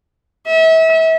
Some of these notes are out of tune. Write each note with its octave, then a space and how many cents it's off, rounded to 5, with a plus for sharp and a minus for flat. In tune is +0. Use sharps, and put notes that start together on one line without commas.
E5 -35